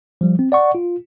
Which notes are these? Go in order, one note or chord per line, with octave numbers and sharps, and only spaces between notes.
F3 G3
C4
D5 F#5 C#6
F4